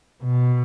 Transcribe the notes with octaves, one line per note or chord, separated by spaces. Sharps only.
B2